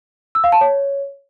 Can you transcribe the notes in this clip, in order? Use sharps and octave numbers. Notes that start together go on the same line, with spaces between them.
E6
F5
A5
C#5